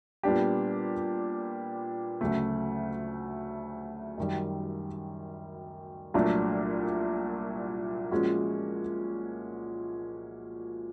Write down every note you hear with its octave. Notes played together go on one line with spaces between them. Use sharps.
A#2 G3 B3 D4 G4
D2 C#3 F#3 A3
F#2 D#3 G3
C2 A#2 F#3 A3 D4
A#2 F3 G#3 C#4 F#4